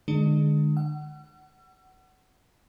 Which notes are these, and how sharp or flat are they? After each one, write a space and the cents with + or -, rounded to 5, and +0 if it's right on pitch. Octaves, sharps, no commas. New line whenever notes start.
D3 +40 G#3 +15 D4 +40
F#5 +20 E6 +45